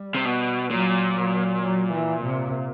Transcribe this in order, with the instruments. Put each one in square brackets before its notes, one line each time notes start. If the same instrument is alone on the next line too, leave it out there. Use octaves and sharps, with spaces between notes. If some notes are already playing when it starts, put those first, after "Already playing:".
Already playing: [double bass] G3
[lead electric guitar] C3
B2
[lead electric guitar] A#2 [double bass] F#3
[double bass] F#3
F#3
E3
C3